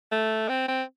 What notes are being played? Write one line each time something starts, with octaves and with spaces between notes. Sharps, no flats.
A3
C4
C4